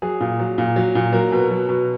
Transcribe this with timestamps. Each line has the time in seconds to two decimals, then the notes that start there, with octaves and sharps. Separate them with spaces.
0.02 F#3 G#4
0.20 A#2
0.39 F#3
0.58 A#2
0.76 F#3
0.95 A#2
1.13 F#3 A#4
1.32 B2
1.51 F#3
1.69 B2